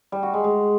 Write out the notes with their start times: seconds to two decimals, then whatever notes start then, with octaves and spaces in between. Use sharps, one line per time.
0.12 G3
0.23 F#4
0.34 G#3
0.44 G#3